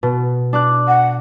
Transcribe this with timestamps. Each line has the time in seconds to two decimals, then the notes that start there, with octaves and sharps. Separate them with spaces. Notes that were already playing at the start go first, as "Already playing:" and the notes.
0.03 B2
0.53 D4 D6 F#6
0.88 F#5